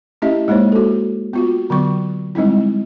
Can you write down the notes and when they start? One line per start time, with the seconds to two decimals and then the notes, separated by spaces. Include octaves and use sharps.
0.22 A3 C#4 E4 G4 D#5 E5
0.48 G#3 A#3 D#4 C5 C#5
0.72 F#4 A4
1.33 B3 F4 F#4
1.70 D3 F#3 B3 C#6
2.35 G3 G#3 C4 D#4 E4